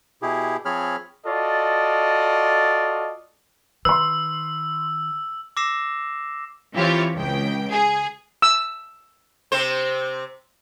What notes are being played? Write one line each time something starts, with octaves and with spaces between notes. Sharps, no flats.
B2 E4 G4 G#4
F3 C4 G#4 C#5 B5 F6
F4 F#4 A4 D5 D#5
D#3 B4 C6 E6
D6 E6 A#6 C7 E7
E3 C4 F4 G4 C#5
C#2 G5
G#4
E6
C3 C4 C5